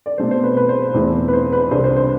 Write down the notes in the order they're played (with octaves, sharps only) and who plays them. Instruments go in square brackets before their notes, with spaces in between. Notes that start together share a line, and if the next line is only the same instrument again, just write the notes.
[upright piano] D5
B2 A3 C4 C5
C5
B4
B4
C5
E2 B2 A3 C4 E4
B4
C5
B4
C2 C3 G3 D4 C5
C5
C5